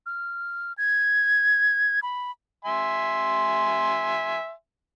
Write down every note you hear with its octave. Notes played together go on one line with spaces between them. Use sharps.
F6
G#6
B5
E5 G#5 C6